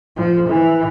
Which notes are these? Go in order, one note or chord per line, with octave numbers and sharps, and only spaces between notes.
F3
E3